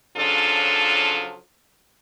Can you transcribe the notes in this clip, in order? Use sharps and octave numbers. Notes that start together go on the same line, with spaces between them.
C#3 F3 F#3 D4 F4 A4